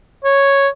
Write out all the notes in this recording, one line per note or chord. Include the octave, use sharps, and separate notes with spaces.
C#5